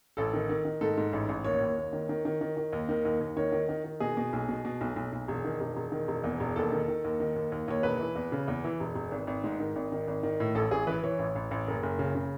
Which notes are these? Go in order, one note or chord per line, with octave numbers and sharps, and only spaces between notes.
A1 A4
D#3
D#3
D#3
G#2 A4
G#2
A1
A1
D#2 C#5
D#2
D#2
D#3
D#3
D#3
D#3
D#3
D#2
D#3
D#2
D#2
D#3 C#5
D#3
D#3
D#3
B2 G#4
B2
B1
B2
B2
B1
B1
B1
E1
D#3
E1
E1
D#3
E1
E2
E1
D#2 A4
D#3
D#3
D#2
D#3
D#2
D#2
D#2 C#5
E1 B4
E3
E2
C#3
E2
E3
E1
E1
G#1
G#1
G#2
D#3
G#1
D#3
G#1
D#3
A2
A1 A4
A1 G#4
E3 B4
E3 C#5
A1
A1
A1
F#1
F#1
C#3
C#3